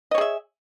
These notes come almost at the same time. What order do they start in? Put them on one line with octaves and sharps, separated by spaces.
D#5 C#5 G#4 E5